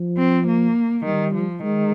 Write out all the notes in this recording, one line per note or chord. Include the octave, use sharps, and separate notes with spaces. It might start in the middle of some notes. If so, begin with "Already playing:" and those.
Already playing: F3
C4
A#3
D#3 G3
F3
D#3 G#3